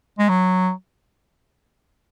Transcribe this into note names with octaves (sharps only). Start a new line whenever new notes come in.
G#3
F#3